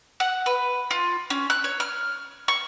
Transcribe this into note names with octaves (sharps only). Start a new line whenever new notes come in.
F#5
B4
F4
C#4
F#6
C#5
F6
C#6